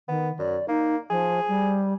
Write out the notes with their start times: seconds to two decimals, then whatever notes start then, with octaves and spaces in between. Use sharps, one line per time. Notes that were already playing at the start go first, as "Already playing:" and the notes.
0.08 D#3 B3
0.39 F#2 D5
0.68 A#3 D#4
1.10 F3 G#4
1.48 G3